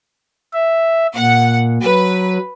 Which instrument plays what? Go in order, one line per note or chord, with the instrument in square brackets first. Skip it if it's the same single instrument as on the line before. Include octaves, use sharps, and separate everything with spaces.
[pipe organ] E5
[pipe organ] A#2 [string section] F#5
[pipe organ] F#3 [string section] B4